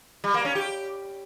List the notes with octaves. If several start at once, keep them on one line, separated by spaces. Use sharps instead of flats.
G3
A#3
C#4
G4